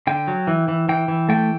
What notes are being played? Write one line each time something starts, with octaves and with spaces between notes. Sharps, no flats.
D3 G5
F#3
E3
E3
E3 G5
E3
A3 G5